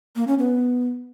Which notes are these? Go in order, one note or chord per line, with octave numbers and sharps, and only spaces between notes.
A#3
C#4
B3